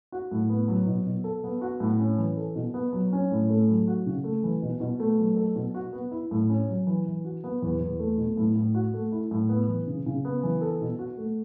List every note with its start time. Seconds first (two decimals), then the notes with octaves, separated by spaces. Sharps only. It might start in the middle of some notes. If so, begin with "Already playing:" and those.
0.12 F#4
0.31 A2
0.49 B3
0.68 F#3
0.86 B2
1.06 B2
1.24 A4
1.44 B3
1.61 F#4
1.80 A2
1.99 C#4
2.18 E3
2.37 A4
2.56 B2
2.74 B3
2.93 F#3
3.13 C#4
3.31 A2
3.49 A3
3.68 F#3
3.88 F#4
4.06 C#3
4.24 A3
4.43 E3
4.62 B2
4.80 B2
5.00 A3
5.18 F#3
5.36 A4
5.56 B2
5.74 F#4
5.93 B3
6.11 E4
6.31 A2
6.49 C#4
6.69 F#3
6.87 E3
7.06 E3
7.25 F#4
7.44 B3
7.62 E2
7.80 E2
7.99 A3
8.18 B2
8.37 A2
8.56 A2
8.75 F#4
8.94 A3
9.12 E4
9.31 A2
9.49 B3
9.68 E3
9.87 C#3
10.06 C#3
10.25 B3
10.43 E3
10.61 A4
10.81 B2
10.99 F#4
11.17 A3